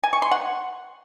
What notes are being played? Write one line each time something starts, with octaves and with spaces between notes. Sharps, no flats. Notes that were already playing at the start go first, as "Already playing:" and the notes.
G#5
C#6
C6
F#5